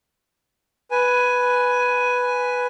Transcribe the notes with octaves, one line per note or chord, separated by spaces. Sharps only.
B4 G#5